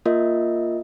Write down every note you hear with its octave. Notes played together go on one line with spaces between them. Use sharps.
A#3 F4 A#4 D#5 E5